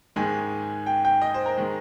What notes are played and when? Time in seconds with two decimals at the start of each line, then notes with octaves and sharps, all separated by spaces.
0.16 G#2 D#3 G#3 G#5
0.86 G5
1.05 G5
1.22 D#5
1.34 C5
1.46 A#4
1.58 D#3 G#3